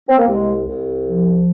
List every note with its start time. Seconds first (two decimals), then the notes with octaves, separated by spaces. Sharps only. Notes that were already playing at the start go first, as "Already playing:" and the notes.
0.09 C4
0.18 A#3
0.28 C2 G#3
0.68 C2
1.07 F3